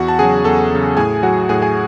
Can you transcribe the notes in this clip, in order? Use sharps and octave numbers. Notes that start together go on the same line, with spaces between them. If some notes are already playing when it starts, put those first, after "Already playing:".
Already playing: E2 F#4 F#5
A5
C#3 F#3 G#4 G#5
E2 A4 A5
C#3 F#3
A2 G#4 G#5
F#3 F#4 F#5
A2 G#4 G#5
G#4 G#5